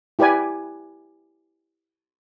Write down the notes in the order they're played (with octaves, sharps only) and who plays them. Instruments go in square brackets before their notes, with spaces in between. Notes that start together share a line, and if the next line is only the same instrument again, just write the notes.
[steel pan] E4 G4 B4 D5 G#5